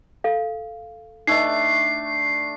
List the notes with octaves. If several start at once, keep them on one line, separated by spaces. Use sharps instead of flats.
A4 F5
A3 D4 D#4 D#5 C7